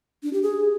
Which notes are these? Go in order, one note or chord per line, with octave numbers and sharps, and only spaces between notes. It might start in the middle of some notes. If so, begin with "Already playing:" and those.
D4
G4
G#4